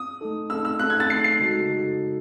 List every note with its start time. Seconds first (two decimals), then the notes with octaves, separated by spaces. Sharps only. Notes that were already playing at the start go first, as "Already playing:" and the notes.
Already playing: D#6
0.21 A3 D#4 A4
0.50 A3 D#4 A4 E6
0.65 E6
0.79 A3 D#4 A4 F#6
0.90 G#6
1.00 A6
1.10 A3 D#4 A4 C7
1.24 C7
1.40 C#3 G#3 D#4 F#4 A4
1.69 C#3 G#3 D#4 F#4 A4